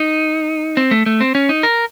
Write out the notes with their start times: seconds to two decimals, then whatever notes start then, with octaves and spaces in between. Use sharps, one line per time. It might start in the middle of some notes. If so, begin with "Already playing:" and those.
Already playing: D#4
0.77 C4
0.91 A3
1.06 A3
1.20 C4
1.35 C#4
1.49 D#4
1.63 A#4